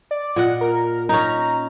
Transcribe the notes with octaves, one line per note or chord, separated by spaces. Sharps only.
D5
A#2 D#5 F#5
A#4
C#4 D#4 A#5